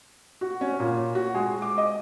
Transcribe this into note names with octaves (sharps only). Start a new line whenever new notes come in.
F#4
C#4
A#2
F#4
G#3
D6
D#5